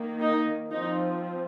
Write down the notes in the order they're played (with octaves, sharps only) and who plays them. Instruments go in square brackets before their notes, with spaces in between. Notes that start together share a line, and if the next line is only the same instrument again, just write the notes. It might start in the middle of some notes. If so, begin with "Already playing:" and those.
Already playing: [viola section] D#3 A#3
D#4
F3 C4 D#4